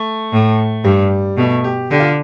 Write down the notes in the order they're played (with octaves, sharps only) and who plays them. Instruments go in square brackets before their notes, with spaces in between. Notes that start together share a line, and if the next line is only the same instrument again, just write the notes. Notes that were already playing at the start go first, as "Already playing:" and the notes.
Already playing: [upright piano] A3
[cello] A2
[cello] G2 [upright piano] G3
[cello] B2 [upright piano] A3
[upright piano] G4
[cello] D3 [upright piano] G4
[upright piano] F4